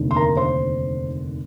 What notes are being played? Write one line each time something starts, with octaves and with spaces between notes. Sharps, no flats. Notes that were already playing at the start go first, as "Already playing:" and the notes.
Already playing: F1 D#2 D3
C6
A#4 A#5
C5 C6